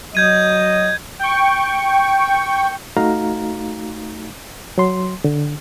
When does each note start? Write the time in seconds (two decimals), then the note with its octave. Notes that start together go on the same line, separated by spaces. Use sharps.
0.15 F#3 D#5 G6 G#6 D#7
1.19 G5 C#6
2.97 A3 D#4 F#4 F5 A#5
4.78 F#3 C6
5.24 D3